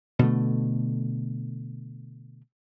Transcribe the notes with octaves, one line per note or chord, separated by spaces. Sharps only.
B2 D3 A3